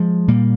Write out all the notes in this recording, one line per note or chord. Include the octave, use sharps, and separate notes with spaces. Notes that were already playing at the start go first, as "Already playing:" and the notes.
Already playing: F3 G#3
A#2 G3 A#3